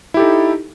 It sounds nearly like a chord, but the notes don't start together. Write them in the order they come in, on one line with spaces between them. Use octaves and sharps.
E4 G4 A4 D#4